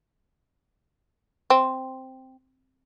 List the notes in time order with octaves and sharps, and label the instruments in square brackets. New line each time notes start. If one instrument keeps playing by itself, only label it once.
[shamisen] C4